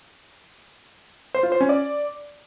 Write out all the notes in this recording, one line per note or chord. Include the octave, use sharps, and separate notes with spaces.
C5
F4
C5
C#4
D5